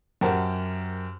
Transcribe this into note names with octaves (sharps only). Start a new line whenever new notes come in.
F#2 G4 A#4 C5 F#5 A5